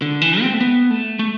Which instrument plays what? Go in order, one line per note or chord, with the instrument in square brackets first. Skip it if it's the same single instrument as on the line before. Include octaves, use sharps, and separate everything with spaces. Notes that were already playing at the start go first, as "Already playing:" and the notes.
[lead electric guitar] D3
E3
C4
A3
B3
A3
A3